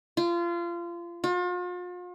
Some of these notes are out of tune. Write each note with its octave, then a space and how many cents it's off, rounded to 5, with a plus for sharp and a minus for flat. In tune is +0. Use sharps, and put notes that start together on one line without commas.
F4 -25
F4 +40